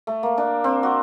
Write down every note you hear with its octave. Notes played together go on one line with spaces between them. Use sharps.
A3
A#3
D4
C4
F#4